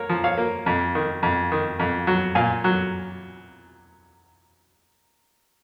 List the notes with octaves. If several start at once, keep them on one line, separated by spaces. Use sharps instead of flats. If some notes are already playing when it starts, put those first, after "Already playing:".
Already playing: A#3 A#4 C#5
F3
C#5 F5
A#3
F2
D#3
F2
D#3
F2
F#3
A#2 F5 G#5
F#3